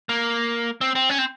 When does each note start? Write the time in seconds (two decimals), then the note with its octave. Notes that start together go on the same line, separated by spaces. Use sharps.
0.09 A#3
0.81 C4
0.95 C4
1.10 C#4
1.18 C4